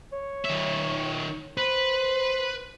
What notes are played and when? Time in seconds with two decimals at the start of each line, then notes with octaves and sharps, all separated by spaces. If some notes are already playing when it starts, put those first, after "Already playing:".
0.12 C#5
0.45 D#3 E5
1.57 B4 C5